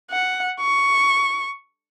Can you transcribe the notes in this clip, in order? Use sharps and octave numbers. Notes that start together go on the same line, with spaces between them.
F#5
C#6